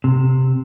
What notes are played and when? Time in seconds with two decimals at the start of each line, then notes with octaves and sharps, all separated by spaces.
0.04 C3